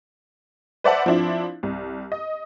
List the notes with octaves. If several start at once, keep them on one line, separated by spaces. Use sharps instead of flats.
B4 C5 D5 E5 F#5 A5
F3 C4 D4 E4
C2
D#5